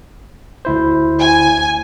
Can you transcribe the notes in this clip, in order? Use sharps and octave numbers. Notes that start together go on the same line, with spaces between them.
D2 E4 C5
G#5